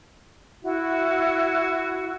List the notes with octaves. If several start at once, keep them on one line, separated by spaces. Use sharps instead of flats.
E4 F#4